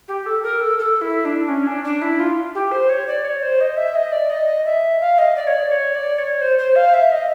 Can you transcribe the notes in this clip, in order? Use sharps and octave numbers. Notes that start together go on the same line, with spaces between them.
G4
A4
A#4
A4
A4
E4
D4
C#4
D4
D4
E4
F4
G4
C5
C#5
D5
C#5
C5
D#5
E5
D#5
D5
D#5
E5
F5
D#5
D5
C#5
D5
C#5
D5
C#5
C5
C5
F5
E5
D#5